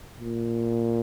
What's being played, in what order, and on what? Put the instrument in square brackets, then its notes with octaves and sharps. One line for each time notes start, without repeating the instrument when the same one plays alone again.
[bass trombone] A#2